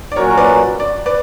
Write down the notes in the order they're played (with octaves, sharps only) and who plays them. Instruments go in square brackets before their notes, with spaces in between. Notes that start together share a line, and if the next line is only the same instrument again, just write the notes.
[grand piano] D5
[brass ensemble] A#2 F#3 C#4 F#4 [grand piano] A#4 C#5
[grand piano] B4 D5
D5
B4 D5